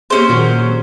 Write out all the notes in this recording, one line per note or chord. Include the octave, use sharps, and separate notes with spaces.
A#3 C#4 G4 G#4 C5
A#2 D#3 F#3 F#4